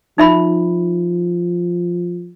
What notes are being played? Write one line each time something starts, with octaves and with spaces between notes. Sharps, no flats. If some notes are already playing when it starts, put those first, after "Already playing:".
F3 D#4 E5 B5